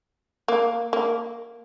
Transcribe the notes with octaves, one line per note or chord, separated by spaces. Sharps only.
A#3
A#3